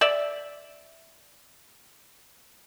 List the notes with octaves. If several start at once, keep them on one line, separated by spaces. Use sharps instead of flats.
D5 E5